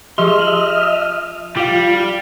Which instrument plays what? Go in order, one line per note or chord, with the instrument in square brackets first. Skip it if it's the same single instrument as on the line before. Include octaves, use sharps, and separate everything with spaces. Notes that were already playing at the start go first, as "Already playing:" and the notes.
[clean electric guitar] F3 C6 [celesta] G4 G#4 [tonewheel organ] D#5 E5 F6
[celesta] F#7
[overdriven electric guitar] G3 [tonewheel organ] F4 [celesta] F5 D6